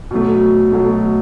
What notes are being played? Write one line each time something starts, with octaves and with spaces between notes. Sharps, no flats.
B2 F#3 A3
B2 F#3 A3